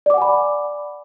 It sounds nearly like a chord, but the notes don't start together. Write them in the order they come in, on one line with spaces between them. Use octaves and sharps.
D5 D6 F#5 G#5 B5